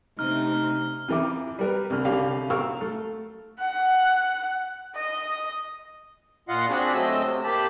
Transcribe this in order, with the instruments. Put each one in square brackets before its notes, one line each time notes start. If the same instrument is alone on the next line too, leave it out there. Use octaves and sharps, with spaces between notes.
[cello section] C3 A3 D4 [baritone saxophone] D#4 [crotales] F6
[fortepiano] F2 E3 A#4 E5 D6
G3 A#4 B4
C2 D3 F6
C2 D3 C#4 G4 F5
A#4 F5 C#6 E6 F6
A3
[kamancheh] F#5
D#5
[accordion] A#2 F4 D#5 F5 F#5
C4 D4 F#4 G#4 B5
F#3 A3 C4 D#5 E6
C3
A#3 G4 A5 B5